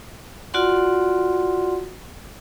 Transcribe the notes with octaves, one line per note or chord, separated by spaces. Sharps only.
F4 F#4 D5 F#5 C6